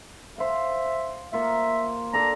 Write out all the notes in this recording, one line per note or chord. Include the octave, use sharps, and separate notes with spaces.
C5 E5 F5
A#3 F4 E5 C#6
D4 A4 D5 A#5